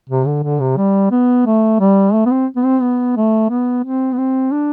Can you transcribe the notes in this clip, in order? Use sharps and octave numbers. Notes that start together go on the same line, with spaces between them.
C3
D3
D3
C3
G3
B3
A3
G3
A3
B3
C4
B3
C4
B3
A3
B3
C4
B3
C4
D4